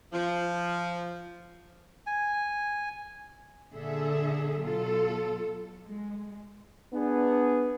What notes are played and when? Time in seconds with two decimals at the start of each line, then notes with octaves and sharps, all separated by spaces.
0.13 F3
2.06 G#5
3.71 A#2 D3 G#4 A4 E5
4.59 B2 F#3 F4 A4
5.84 G#3
6.94 B3 D4 G#4